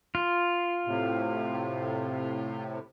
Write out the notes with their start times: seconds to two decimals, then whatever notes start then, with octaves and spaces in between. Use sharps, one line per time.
0.15 F4
0.87 A2 C3